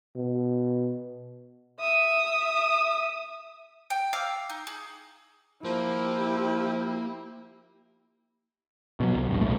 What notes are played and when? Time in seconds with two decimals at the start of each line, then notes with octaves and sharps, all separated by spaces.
0.16 B2
1.79 E5 D#6
3.90 G5
4.13 F5 D6 E6
4.50 D#4
4.67 G#4
5.65 F3 A#3 E4 G4
9.00 B2 F3 F#3
9.15 C2
9.29 A1 E2 G2
9.41 C2 B2 A3